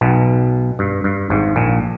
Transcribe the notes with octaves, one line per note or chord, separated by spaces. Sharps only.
B1 B2
G2
G2
G#1 G#2
A#1 A#2